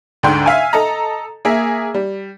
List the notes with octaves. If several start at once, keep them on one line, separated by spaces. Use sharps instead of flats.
D2 G#2 D3 D4 G5 C6
E5 F5 G#5
A4 D#5 A#5
A#3 G#4 E5
G3